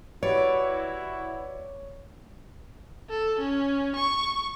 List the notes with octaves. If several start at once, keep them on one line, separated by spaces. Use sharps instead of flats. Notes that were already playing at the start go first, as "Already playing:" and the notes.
E4 F#4 G4 B4 C#5 D5
A4
C#4
C#6